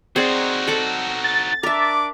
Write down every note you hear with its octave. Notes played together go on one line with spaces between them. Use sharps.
C4 D#4 F#4 G#4 D5
A4 F#5 D6
A6
D4 A#4 E5 D6